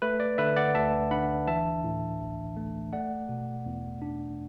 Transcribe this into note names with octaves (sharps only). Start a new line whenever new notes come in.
A3 B4
D5
D3 B4 E5
D5 F#5
D2 E5 A5
D4 F#5 B5
E3 E5 A5
A2
A1
A3
A3 D5 F#5
B2
E2
D4